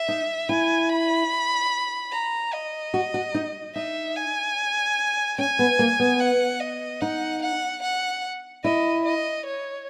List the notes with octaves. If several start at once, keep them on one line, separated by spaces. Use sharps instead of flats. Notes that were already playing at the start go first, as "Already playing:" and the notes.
Already playing: E5
D#4
E4 G#5
B5
A#5
D#5
F#4
F#4
D#4
D#4 E5
G#5
C#4 G#5
B3
A#3
B3
F#5
D#5
D#4 F#5
F#5
F#5
E4 D#5
D#5
C#5